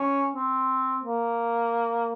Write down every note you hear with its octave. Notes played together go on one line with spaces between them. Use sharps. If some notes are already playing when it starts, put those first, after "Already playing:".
Already playing: C#4
C4
A#3